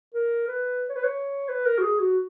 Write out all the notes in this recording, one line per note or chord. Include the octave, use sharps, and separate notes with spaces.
A#4
B4
C#5
B4
C#5
B4
A#4
F#4
G#4
F#4